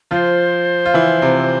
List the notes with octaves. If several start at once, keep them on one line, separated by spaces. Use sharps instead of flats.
F3 F4 C5
F4
E3 E4
C3 C4